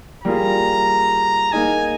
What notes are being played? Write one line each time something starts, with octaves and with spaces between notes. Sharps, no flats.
G3 A#3 F4 G#4 A#5
A#3 D#4 G#4 G#5